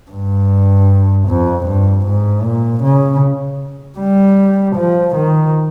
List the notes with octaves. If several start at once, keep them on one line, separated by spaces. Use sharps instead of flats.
G2
F2
G2
G#2
A#2
C#3
G3
F3
D#3